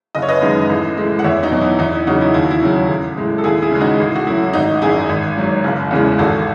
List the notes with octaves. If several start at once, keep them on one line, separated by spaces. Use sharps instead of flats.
F#1 D#5
C#5
B4 D#5
F#2 D#3 G#3
A1
A2 G#3
F#5
E2 C#5 E5
D#4 F#4
B2 F#3
E4
E2 D#4
E4
C#3 F#3 D#4 F#4
E4
D#2 E4
F#4
E4
C#3 F#3
A1
A2 G#3
A4
D#2 E4 G#4
E4 G#4
C#3 E3 G#3
D#4 F#4
A1
F#4
A2 F#3 E4
E4
G#1 D#4 F#4
F#2 E3 E4 G#4
G#1
G#2 F#3
F#1
E2 C#3 E3 G#3
G#1 F#4 A4